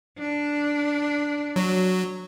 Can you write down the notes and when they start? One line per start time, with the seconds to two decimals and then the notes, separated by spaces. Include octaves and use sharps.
0.18 D4
1.56 F#3